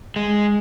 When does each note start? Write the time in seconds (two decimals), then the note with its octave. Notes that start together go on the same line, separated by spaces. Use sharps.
0.16 G#3